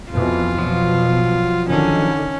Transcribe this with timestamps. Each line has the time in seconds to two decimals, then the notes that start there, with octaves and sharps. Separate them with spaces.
0.12 F2 B2 E3 F4
0.59 B2 F3 F#3
1.69 D3 D#3 C#4